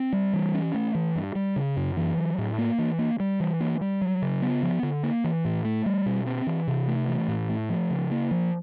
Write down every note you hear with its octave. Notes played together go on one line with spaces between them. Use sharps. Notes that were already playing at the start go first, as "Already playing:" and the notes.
Already playing: C4
G3
E3
C#4
A3
E3
G2
G3
C#3
F#2
E3
F#3
A2
A#3
E3
A#3
G3
E3
A#3
G3
F#3
C#3
B3
F3
D3
A#3
E3
A2
A3
G3
B2
C4
E3
C3
A3
E3
A2
A3
F3
C#3
A#3
F3